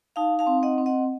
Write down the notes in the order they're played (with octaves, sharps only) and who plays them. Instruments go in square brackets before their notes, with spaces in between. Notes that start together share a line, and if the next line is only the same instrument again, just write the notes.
[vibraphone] D#4 F5 A5
F5 A5
C4
D#5 F#5
C4
D#5 F#5